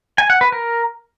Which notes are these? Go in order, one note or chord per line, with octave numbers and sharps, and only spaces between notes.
G#5
F#5
B4
A#4